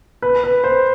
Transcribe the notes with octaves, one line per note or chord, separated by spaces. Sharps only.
B4
B4
C5